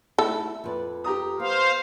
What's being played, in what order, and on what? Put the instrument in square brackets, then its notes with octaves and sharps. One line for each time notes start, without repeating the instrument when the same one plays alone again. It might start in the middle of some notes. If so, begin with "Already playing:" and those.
[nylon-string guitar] A3 D#4 E4 [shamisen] A4
[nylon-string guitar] F2 B4 D5
[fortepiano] G4 A#5 D#6
[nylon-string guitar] B3 [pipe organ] C5 F5